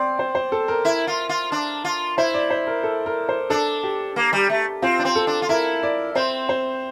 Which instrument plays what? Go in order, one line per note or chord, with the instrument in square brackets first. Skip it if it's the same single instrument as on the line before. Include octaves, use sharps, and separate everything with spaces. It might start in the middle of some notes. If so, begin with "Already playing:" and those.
Already playing: [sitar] C4 [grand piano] D5
[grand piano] C5
C5
A4
A#4
[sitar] E4
F4
F4
D4
F4
[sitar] E4 [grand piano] C5
[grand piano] D5
C5
A#4
A4
A#4
C5
[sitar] D4 [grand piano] A4
[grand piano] G4
[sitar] A#3
G3
A3
[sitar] C4 [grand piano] F4
[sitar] D4
C4
[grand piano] A4
[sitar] D4
F4
[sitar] E4 [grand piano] A#4
[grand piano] D5
[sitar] C4 [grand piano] C5
[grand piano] C5